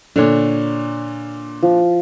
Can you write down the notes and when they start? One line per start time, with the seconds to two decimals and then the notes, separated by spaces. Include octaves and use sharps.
0.16 A#2 D3 D4 C#5
1.63 F3